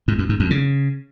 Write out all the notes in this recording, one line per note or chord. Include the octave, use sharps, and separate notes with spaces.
G#2
F#2
G#2
F2
C#3